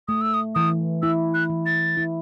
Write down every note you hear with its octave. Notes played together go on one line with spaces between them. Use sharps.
A3 D#6
E6
D#6
E3 D#6
E4 E6
F#6
E3
A6
E4